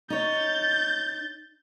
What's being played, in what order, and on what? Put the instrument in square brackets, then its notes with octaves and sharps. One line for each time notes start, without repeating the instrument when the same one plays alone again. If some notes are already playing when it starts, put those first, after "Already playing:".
[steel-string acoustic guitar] D#4 C#5 [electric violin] G6 A6